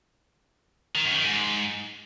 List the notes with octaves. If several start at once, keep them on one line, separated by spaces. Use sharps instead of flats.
D#3
F#2
D#3
G#2